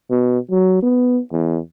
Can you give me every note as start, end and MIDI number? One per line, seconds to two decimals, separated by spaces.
0.11 0.39 47
0.51 0.79 54
0.82 1.20 59
1.32 1.59 40